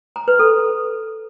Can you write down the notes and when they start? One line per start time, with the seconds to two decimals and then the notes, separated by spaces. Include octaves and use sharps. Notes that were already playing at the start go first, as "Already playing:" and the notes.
0.16 A#5
0.28 B4
0.39 A4